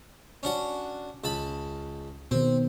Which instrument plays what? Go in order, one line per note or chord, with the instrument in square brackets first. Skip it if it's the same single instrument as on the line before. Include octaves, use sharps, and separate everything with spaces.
[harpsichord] C#4 D4 F#4
C#2 A5 B5
[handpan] B2 D#3 [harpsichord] C4